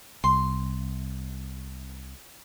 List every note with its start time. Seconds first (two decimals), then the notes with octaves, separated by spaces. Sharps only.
0.24 C2 C6